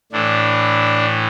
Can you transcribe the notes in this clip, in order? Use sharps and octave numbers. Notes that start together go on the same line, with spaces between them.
A2 E3 D4